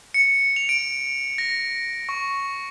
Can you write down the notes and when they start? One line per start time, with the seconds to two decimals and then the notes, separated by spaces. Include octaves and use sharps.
0.14 C#7
0.56 F7
0.69 D7
1.38 A#6
2.09 C#6